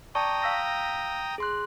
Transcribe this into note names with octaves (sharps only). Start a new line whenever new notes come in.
D5 G5 A5 A#5 C#6 D#6
F5 E6 A#6
G#4 C6 F#6